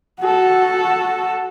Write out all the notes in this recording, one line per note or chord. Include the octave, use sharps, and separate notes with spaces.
F#4 A4